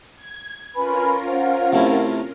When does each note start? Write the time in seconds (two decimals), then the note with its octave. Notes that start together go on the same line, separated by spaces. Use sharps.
0.16 G#6
0.75 C#4 F4 A#4 B4 G#5 B5
1.26 C5 F5 F#5
1.72 C3 A3 E4